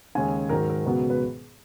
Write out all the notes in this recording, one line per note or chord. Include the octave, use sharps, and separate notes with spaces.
D#2 C#3 G#3 G#5
G#2 D#3 F#3 A#4
A#4
C#2 B2 F#3 B3
B4